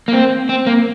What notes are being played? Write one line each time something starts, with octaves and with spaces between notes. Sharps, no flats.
A#3
C4
C4
A#3